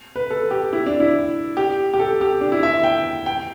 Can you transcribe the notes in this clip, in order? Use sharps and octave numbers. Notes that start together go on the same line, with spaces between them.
B4
A4
G4
E4
D4
E4
G4
G4
A4
G4
D4
E4
E5
G5
G5